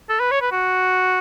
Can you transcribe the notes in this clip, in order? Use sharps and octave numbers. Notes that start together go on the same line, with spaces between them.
A4
B4
C#5
B4
F#4